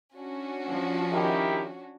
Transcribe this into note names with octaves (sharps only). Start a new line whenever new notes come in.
C#4 D4 F#4
F3
D#3 E4 G4